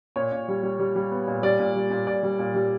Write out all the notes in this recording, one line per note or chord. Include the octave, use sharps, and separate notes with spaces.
A#2 C#5
A#2
G3
G3
G3
G3
B3
A#2
G3 D5
A#2
G3
A#2
A#2 D5
G3
A#2
G3